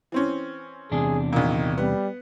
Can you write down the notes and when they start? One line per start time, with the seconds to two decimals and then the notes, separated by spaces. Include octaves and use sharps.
0.12 E3 C4 C#4
0.92 E2 C3 D4 G#4
1.33 A#1 A#2 D#3
1.78 G3 B3